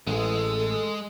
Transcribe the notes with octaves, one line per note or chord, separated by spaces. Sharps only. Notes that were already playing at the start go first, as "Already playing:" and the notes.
A1 G#3 G#4 A4